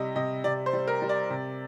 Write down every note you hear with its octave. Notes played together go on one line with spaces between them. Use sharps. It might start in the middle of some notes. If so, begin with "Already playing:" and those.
Already playing: C3 G3 D#5
C3 D#5
C3 D5
C5
G3
A#4
G3
D5
C3